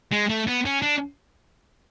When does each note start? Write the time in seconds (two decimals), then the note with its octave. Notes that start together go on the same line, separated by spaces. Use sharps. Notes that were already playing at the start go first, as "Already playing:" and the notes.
0.12 G#3
0.29 A3
0.47 B3
0.65 C#4
0.82 D4